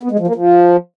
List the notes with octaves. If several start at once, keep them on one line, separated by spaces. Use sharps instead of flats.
B3
G#3
F3
A#3
F3